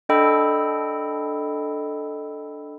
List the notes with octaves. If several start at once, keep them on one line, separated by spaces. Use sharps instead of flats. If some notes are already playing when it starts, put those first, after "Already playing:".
D4 A4 D#5 G5 B5 E6